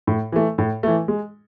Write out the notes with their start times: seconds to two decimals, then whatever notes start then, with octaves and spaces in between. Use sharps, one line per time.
0.07 A2
0.32 E3 A3
0.58 A2
0.83 E3 A3
1.08 G#3